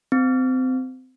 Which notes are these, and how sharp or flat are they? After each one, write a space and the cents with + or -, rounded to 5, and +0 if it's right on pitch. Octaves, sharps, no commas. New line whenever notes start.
C4 -25